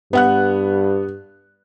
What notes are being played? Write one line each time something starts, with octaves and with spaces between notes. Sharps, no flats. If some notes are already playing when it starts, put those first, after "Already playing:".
G2 B3 F#5 F#6